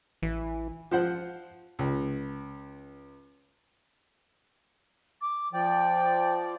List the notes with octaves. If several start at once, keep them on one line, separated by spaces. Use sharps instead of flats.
A1 E3
F3 C5 F#5
C#2
D6
F3 D5 G5